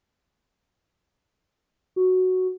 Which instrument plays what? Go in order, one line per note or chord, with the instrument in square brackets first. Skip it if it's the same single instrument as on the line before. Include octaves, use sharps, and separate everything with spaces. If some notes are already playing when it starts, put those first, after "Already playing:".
[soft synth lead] F#4